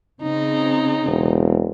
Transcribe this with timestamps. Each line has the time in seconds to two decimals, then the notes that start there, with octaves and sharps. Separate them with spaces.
0.23 C#3 C4 D#4
1.06 E1